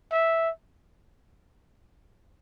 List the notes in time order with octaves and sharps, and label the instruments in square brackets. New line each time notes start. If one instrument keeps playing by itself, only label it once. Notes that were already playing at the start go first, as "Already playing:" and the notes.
[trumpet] E5